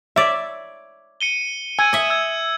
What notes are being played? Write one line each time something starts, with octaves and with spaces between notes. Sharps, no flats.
C#5 D5 E5
C#7 D#7 G7
G#5 E6 G#6
D#5 E5
E6 G#6